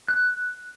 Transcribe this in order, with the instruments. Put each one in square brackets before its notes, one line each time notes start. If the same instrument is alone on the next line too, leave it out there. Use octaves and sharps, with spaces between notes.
[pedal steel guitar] F#6